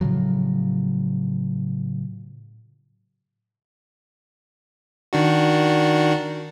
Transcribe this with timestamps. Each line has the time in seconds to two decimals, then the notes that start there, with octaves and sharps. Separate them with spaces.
0.01 A2 C#3 F3 F#3
5.13 D#3 D4 F#4